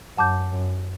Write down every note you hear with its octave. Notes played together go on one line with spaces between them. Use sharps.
F#2 F#5 A5 D6 G6
F#2